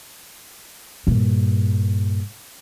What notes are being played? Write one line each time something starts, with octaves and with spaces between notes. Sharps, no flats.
G2 A#2